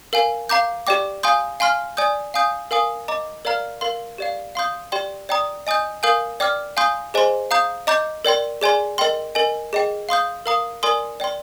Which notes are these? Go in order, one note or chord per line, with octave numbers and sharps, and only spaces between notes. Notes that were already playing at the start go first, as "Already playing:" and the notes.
A#4 F5 G#5
F5 A#5 D6 G6
G4 D5 G5 D6
F5 G#5 C6 D#6 G6
F5 G#5 C6 F6
D5 G#5 D#6 G6
F5 G#5 D#6 G6
A#4 F5 G#5 D#6
D#5 A#5 D6
A#4 D5 F5 A#5 F6
A#4 F5 C6
G4 D5 F5
F5 C6 D#6 G6
G4 D5 G5 C6
D5 G5 A#5 D#6
D#5 G#5 D#6 G6
A#4 F5 G#5 D#6 G6
D5 G5 D6 F6
F5 G#5 C6 D#6 G6
G#4 C5 D#5 G#5 C6
F5 A#5 D#6 G6
D#5 A#5 D6 G6
A#4 D5 G5 C6
G#4 D5 G#5 C6
A#4 D#5 G5 C6
A#4 D#5 G#5
G#4 D#5 G5
F5 C6 D#6 G6
A#4 F5 A#5 D#6
A#4 D5 G#5 C6 D#6
D5 G5 C6